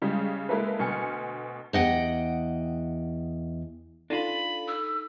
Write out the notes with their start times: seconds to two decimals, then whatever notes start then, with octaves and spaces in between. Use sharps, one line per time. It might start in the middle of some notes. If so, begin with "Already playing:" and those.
0.02 C#3 G3 G#3
0.49 G#3 A#3 E4 A4 B4
0.79 D2 B2 G#5 F6 C#7
1.73 E2 D#5 F#5 G5
4.10 D4 D#4 F4 A4 B5
4.68 E6